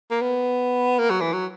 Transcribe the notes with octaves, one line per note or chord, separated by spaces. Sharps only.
A#3
B3
A#3
F#3
E3
F#3